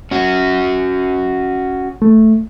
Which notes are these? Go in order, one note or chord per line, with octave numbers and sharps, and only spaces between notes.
C#4 F#4
A3